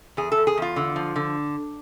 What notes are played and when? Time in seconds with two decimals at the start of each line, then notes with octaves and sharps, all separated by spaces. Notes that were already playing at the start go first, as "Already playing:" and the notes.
0.17 E2 G#4
0.32 A4
0.37 E2
0.47 G#4
0.57 E2 F4
0.76 D3
0.96 F3
1.16 D3